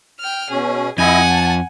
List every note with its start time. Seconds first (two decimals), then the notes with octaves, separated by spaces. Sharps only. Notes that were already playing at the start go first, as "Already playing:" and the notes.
0.20 G5 F6
0.50 B2 C#4 G#4
0.98 F2 E4 D#5 F#5 G#5
1.30 A5